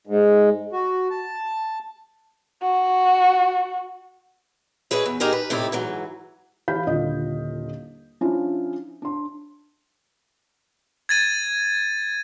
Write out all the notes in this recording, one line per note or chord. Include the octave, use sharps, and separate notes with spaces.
G#2
F#4
A5
F#4
E4 G#4 B4 C#5 D#5
E2
D#4 G4 G#4 A#4 D#5
B4
A2 C3 G3 D#4 E4
G#2 E3 F#3
E3 G4 F5 B5 G6 B6
D#1 D3 E4 F4 D#5
F3 C#4 D4 E4 F4
D4 C6
G#6 A6 D#7